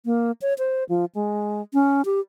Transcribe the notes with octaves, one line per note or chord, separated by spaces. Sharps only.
A#3
C#5
C5
F3
G#3
C#4
G4